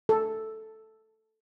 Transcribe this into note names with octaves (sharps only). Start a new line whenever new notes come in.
A4